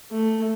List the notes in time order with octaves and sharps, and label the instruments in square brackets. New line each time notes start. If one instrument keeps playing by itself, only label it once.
[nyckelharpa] A3